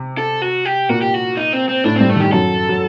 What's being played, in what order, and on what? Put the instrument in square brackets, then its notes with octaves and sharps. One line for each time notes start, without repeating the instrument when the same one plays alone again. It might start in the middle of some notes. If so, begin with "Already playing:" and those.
Already playing: [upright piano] C3
[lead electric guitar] A4
F#4
G4
[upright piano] A#2 A#3 [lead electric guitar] F#4
[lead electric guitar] G4
F#4
D#4
C4
C4
[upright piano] A2 A3 [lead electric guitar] D4
[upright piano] G2 G3 [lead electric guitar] C4
[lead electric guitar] A3
[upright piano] D#3 [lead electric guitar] G4
[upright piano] F#2 F#3 [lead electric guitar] A4
[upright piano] F#3